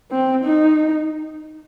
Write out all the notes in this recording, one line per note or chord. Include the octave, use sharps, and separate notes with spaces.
C4
D#4